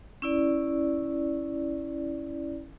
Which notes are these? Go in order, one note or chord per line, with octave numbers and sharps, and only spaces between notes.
C#4 E4 D5